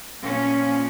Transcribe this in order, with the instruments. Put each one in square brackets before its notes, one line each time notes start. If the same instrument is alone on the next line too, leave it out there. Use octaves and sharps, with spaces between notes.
[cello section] A#2 F3 C#4